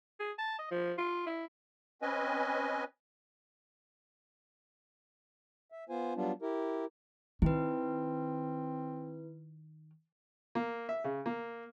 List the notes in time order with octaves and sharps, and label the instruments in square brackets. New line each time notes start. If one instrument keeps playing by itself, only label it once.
[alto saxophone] G#4
A5
D#5
F3
F4
E4
[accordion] C4 C#4 B4 D#5 G#5
[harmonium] E5
B3 F4 C5 G#5
F#3 G3 B3 D4 F4
E4 G4 A#4
[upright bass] D#3 [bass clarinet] C4 [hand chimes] E4 B4
[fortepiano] A#3
E5
C#3
A#3